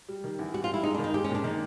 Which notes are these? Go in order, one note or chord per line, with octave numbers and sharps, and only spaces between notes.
G3
D#3
E2
G3 F#4
F4
G3 E4
G#3 D#4
D4
D#3
D#4
G#3 G4
C#4
A#2 D4
D#3 D#4